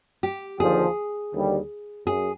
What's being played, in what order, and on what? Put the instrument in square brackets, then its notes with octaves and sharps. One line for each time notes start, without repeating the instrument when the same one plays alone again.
[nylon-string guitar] G4
[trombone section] D#2 D3 F3 [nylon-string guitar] G#4
[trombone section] D#2 D3 G3
[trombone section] F#2 [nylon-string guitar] G#4